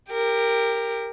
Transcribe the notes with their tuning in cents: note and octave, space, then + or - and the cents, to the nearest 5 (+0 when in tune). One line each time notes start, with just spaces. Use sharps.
G4 +20 A#4 -10